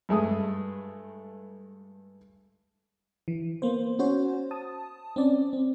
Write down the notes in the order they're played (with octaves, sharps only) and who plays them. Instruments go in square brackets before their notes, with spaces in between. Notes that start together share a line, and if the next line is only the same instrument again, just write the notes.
[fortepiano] G2 G#3 A3 D#6
[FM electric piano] E3
A#3 B3 C5
C#4 F#4 C5 C#5
A5 D#6
C4 C#4 D5
C4